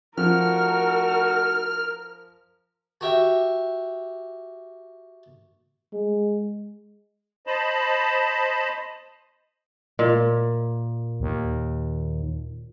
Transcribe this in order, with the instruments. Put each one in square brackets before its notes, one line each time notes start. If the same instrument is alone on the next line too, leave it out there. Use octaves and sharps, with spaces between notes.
[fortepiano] F3 [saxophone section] A3 D#4 F#4 [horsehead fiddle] A#4 [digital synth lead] F6
[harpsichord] F#4 G4 E5
[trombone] G#3
[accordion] C5 D#5 A5 B5
[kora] A#2
[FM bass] D#2